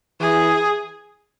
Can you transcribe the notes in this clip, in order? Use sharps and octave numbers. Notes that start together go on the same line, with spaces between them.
E3 G#4